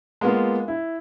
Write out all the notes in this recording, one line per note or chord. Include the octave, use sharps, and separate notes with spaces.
G#3 A#3 B3 F4
E4